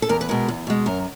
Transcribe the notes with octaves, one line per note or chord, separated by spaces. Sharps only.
A4
E2 A#4
B4
B2 G#3 A#4
E2
B2 G#3
F#2 A#4